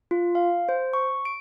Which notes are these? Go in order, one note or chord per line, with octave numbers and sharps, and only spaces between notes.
F4
F5
C5
C#6
D7